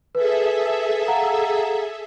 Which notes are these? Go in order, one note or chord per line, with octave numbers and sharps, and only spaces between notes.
G#4 A4 B4 E5
F5 F#5 A#5